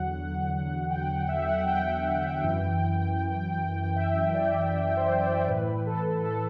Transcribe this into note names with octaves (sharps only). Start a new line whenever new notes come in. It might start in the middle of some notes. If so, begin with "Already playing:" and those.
Already playing: E2 D3 F#3 F#5
G5
F#5
E5
F#5
G5
F#2 E3
E5
D5
C5
D5
A2 E3 B4
A4
A4